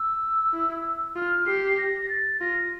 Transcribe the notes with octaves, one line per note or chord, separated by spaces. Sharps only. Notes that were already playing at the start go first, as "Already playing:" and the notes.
Already playing: E6
E4
F4 F6
G4 C7
A#6
A#6
A6
F4 A#6